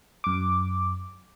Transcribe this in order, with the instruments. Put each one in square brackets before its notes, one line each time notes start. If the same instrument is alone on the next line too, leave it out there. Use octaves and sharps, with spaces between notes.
[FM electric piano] F#2 D6